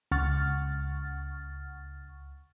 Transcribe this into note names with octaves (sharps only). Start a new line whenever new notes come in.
C#2 F#5 C#6 F6 A6